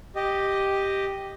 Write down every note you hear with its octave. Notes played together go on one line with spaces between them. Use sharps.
G4 D#5